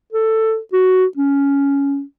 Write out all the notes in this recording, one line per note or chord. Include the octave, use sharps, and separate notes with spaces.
A4
F#4
C#4